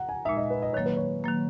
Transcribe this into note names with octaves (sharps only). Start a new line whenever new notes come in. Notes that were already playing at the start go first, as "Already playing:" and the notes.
Already playing: F#5 A#5
G#5
A#2 G#3 D#4 E5
D#5
B4
D#5
D#3 F#3 A#3 C#5
B4
C#5
D#3 F#3 A#3